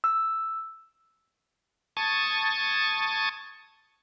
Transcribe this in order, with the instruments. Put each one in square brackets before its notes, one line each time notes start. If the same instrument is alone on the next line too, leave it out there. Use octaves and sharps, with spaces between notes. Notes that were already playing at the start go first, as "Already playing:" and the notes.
[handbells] E6
[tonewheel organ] A5 C#6 D#6 G#6 A6